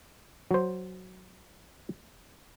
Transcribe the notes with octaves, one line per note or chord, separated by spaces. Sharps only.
F#3 C5